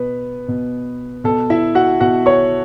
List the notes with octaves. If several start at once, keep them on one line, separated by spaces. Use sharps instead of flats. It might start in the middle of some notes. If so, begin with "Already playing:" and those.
Already playing: B2 B3 B4
B2
B2 A4
E4 E5
F#4 F#5
B2 F#4 F#5
C#5 C#6